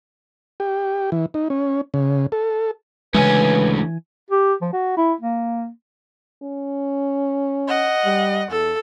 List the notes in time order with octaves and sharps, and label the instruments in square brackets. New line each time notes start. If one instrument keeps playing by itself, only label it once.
[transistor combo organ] G4
E3
D#4
C#4
C#3
A4
[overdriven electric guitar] D2 C#4 [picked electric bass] C#3 G#3 [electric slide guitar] E3 E5 G#5 [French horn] B4
[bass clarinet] G4
F3
F#4
E4
A#3
[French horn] C#4
[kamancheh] D#5 F#5
[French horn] G3
[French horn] E2 [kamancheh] A4